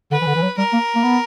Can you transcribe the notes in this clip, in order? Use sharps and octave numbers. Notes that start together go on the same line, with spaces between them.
D3 B4
E3
D3
E3
F#3
G3 A#4
A#3
A#3
B3